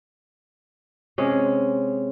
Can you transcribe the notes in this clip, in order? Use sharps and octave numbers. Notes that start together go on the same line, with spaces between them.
C3 G#3 C#4